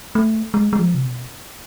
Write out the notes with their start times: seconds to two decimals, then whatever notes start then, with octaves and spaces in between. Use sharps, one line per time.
0.15 A3
0.54 G#3
0.73 G#3
0.79 F3
0.94 C3
1.05 B2